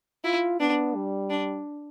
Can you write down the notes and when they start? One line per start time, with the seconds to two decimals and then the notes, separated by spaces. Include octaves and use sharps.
0.24 E4 F4
0.60 B3 D4
0.95 G3
1.30 D4